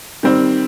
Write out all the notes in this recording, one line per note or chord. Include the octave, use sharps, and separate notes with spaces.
D#3 G3 C4